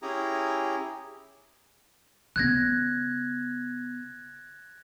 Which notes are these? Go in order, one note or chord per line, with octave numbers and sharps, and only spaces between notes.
C#4 E4 G4 G#4 A#5
C#3 B3 F#6 G#6 A#6